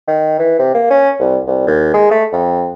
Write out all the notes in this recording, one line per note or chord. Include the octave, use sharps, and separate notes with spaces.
D#3
E3
C3
A#3
C#4
C2
C2
D#2
G#3
A3
F2